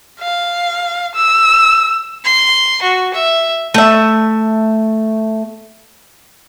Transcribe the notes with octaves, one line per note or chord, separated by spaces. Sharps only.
F5
E6
C6
F#4
E5
A3 E5